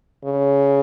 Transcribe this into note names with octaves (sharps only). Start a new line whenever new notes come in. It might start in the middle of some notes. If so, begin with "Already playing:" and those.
C#3